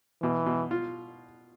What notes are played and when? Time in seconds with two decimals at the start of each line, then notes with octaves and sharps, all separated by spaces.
0.22 B2 E3
0.46 B2
0.71 F4